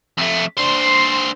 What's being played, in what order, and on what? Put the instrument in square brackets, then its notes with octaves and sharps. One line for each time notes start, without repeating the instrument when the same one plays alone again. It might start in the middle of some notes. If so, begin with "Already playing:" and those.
[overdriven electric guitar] F2 A3
[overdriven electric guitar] D4 C5 [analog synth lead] C6